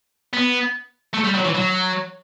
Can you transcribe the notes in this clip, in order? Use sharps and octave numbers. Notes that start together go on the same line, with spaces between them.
B3
A3
G3
F#3
E3
F#3